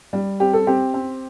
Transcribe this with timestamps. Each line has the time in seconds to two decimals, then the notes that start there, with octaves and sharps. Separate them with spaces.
0.13 G3
0.40 C4 G4
0.53 A4
0.67 C4 G4
0.94 C4